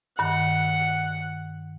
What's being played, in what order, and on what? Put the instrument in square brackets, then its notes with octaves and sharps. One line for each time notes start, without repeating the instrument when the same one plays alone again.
[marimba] G2 D#3 [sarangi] F#5